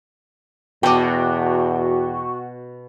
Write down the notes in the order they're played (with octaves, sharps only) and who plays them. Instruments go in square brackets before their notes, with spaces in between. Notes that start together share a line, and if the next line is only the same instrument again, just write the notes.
[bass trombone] E2 [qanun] B2 D#5 [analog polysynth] F#4 [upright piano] G5 A5 D6